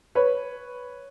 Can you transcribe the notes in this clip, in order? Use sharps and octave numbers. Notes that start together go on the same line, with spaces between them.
B4 C#5